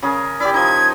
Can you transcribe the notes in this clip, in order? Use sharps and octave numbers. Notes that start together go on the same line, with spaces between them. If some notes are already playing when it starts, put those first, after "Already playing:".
C#3 G#4 A#4
E4 G4 D5
F3 D#4 G#6